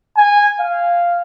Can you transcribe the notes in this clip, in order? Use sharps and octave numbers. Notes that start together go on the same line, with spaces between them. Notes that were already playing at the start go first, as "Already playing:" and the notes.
G#5
F5